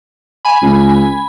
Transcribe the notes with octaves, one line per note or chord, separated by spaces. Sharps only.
G#5 B5
C#2